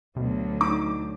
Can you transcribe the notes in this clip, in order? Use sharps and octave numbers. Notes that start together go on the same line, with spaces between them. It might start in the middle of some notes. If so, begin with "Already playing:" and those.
D2 B2 F#3
D#4 D6